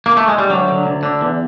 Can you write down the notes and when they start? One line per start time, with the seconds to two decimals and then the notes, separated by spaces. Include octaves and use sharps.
0.06 A#3
0.17 A3
0.28 G#3
0.38 G3
0.50 D2 F#3
0.68 D3
0.86 D2
1.03 D3
1.21 E2